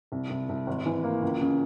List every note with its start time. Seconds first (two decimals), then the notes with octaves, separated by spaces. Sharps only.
0.12 C2
0.30 C2
0.49 C2
0.67 G#1
0.86 E3
1.04 A#3
1.22 C#2
1.41 C#3